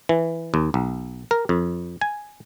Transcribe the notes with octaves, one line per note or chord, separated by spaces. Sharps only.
E3
D#2
B1
A#4
F2
G#5